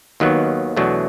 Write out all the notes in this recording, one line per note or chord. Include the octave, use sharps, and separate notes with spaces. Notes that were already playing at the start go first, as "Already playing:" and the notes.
D#2 D#3 F#3 B3
E2 B2 F#3 A3 D4